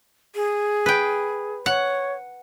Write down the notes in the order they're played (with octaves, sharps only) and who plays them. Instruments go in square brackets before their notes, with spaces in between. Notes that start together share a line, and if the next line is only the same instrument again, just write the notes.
[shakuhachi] G#4
[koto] B4 G5
[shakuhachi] C#5 [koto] F#5